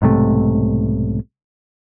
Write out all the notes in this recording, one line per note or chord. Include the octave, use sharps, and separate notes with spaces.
B1 G#2 C3 A3